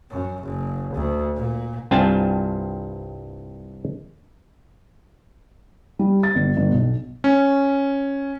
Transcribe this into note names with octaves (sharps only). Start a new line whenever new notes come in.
F#2
F#1
D2
A#2
C2 G2 C4 F4 G#5 A5
G3
A6
G1
G1
B1
C#4